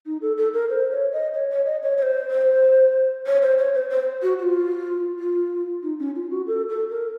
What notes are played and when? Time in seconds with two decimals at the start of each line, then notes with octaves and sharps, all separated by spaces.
0.06 D#4
0.22 A4
0.37 A4
0.54 A#4
0.70 C5
0.91 C#5
1.12 D#5
1.34 C#5
1.50 C#5
1.66 D#5
1.83 C#5
1.98 C#5
2.02 C5
2.31 C5
3.26 C#5
3.42 C5
3.59 C#5
3.74 C5
3.90 C5
4.22 F#4
4.39 F#4
4.43 F4
5.19 F4
5.83 D#4
5.99 C#4
6.16 F4
6.31 F#4
6.47 A4
6.69 A4
6.90 A#4